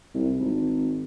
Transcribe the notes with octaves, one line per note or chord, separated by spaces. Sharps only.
C2
G#1